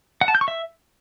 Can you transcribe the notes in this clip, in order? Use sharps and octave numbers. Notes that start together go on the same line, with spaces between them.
F#5
A5
G6
C#6
E5